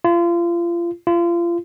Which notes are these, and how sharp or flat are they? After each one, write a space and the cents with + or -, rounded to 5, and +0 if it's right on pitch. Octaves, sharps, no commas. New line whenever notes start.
F4 -30
F4 -30